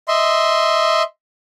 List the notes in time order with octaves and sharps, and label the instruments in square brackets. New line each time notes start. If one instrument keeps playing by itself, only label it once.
[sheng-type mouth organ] D#5 E5 C6